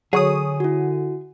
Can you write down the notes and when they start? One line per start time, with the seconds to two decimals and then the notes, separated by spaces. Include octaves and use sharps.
0.13 D3 F#3 G#4 C#5 D#6
0.60 E4 F#4